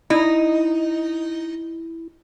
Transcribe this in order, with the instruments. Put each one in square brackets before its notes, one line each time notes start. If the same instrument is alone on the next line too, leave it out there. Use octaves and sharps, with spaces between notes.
[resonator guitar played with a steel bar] D#4 [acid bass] E4